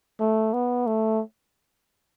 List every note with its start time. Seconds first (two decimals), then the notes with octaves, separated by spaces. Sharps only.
0.20 A3
0.53 B3
0.87 A3